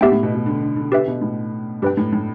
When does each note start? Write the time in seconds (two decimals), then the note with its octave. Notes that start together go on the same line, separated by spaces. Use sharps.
0.01 A2 B3 G4 E5 G5
0.12 A2
0.23 B2
0.34 B2
0.46 D3
0.62 D3
0.76 D3
0.92 D3 G4 B4 E5 G5
1.07 B2
1.21 A2
1.82 G2 G4 B4 G5
1.97 A2
2.13 A2